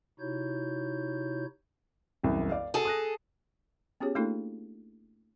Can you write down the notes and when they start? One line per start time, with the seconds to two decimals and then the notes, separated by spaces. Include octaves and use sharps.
0.20 C3 D#4 E4 F#4 C#5 G6
2.23 E1 C2 F#2
2.49 D5 F5
2.74 F#4 G#4 A4
2.85 D#6 F#6 A#6
4.00 B3 C#4 F4 G4 G#4 C#5
4.15 A3 A#3 D4 E4 F#4 A4